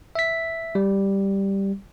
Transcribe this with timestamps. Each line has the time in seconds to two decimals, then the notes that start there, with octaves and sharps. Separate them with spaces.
0.15 E5 B6
0.75 G3